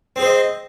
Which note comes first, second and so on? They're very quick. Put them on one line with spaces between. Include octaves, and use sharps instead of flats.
C4 G#4 C5 D#5